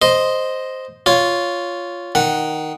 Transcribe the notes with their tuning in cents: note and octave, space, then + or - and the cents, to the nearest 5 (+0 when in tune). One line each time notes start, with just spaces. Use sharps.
C5 +0 D#5 +0
F4 +0 C#5 +10
D#3 +0 F#5 +0